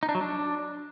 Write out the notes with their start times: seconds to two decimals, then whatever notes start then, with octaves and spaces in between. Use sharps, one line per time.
0.03 D#4
0.09 D4
0.15 F#3
0.21 D4